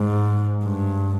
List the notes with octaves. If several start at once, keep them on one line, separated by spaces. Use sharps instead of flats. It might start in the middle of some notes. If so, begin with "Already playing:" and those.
Already playing: G#2
G2